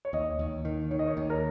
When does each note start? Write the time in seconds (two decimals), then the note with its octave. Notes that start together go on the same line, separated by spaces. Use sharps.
0.05 C#5
0.13 D#2 D#5
0.39 D#2
0.65 D#3
0.91 D#3 C#5
0.99 D#5
1.07 C#5
1.17 D#2
1.30 A#4